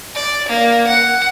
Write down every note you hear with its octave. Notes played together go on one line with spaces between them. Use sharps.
D5
A#3
F#5